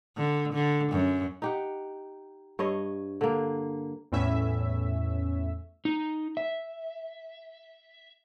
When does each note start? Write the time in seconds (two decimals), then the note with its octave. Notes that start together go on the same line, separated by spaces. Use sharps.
0.17 D3
0.53 D3
0.93 F#2
1.42 D#4 G4 F#5
2.59 G2 C#5 D#5
3.21 D3 A#3
4.12 E2 A2 C#4 E5
5.85 D#4
6.37 E5